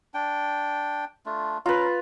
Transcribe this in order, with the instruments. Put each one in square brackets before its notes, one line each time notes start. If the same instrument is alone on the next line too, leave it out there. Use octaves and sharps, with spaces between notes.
[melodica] D4 G5
A3 D4 F4
[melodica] C#4 A#5 [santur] F4 B4